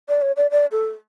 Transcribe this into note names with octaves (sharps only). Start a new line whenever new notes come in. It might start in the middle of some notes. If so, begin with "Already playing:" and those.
D5
C#5
D5
D5
A4